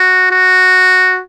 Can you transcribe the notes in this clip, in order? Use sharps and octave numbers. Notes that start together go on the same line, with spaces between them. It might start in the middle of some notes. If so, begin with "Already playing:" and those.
Already playing: F#4
F#4